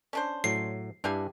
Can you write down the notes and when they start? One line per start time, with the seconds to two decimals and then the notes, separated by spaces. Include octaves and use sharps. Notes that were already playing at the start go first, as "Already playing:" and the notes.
0.13 C#4 D4 C5
0.44 A2 F#3 C7
1.04 G2 D4 E4 G4 F5 G#5